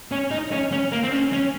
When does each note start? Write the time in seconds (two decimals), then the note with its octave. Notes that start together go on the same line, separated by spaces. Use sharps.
0.11 C#4
0.31 D#4
0.51 C#4
0.72 C#4
0.92 A#3
1.03 C4
1.12 C#4
1.32 C#4